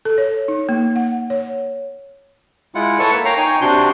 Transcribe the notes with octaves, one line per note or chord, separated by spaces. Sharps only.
A4
C#5
D#4
A#3
F#5
C#5
G#3 E4 F4 F#5
A4 B4 C#5 E5 F#5 A5
A#3
A#4 C#5 F5 G5 A#5
D#4 C#5 G5 G#5
C3 D4 F#4 C6 G6